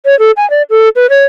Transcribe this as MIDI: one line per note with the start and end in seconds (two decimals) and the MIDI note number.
0.05 0.18 73
0.19 0.31 69
0.37 0.48 80
0.50 0.62 74
0.70 0.89 69
0.96 1.07 71
1.10 1.25 73